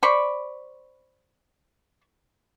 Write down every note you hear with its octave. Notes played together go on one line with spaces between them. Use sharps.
C5 D5 B5 C#6